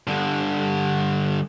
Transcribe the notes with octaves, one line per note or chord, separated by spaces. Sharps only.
G2 D3